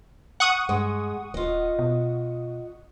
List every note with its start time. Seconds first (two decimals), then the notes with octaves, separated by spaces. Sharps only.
0.40 F#5 C#6 D#6
0.69 G2 G#3
1.34 D1 F4 D#5
1.79 B2